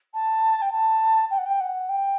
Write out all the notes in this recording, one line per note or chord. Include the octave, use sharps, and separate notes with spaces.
A5
G5
A5
G5
F#5
G5
F#5
G5